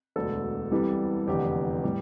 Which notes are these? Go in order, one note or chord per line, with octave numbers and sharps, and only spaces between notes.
E1 D2 D3 A4
C2 C3 E3 G3
F1 E2 D3 G4
A2 G3